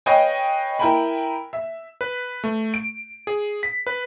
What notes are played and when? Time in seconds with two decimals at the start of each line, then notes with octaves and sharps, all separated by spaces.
0.06 B4 C#5 D#5 F5 G5 G#5
0.79 E4 A#4 G5 G#5 B5
1.53 E5
2.01 B4
2.44 A3
2.74 D7
3.27 G#4
3.63 B6
3.87 B4